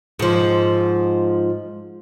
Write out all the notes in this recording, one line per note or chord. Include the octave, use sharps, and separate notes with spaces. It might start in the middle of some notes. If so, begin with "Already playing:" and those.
G#2 F3